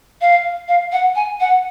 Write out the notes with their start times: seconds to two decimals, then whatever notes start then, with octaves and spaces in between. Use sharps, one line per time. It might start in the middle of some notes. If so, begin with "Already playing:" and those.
0.21 F5
0.68 F5
0.92 F#5
1.15 G#5
1.40 F#5